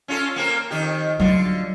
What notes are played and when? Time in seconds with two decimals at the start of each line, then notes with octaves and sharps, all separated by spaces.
0.08 C#4 F4 A4
0.36 A#3 C4 A#4
0.71 F2 D#3 G4
1.20 D3 F#3 F4